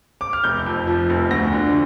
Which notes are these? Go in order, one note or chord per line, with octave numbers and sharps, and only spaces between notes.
D6
F6
F1 G6
F2
F3
F1
D2 A#6
D3